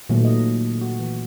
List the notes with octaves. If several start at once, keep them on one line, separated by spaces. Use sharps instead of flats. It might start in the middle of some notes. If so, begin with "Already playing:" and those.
A#2 D#3 F#3 A3 B3
D#5
F#4
E3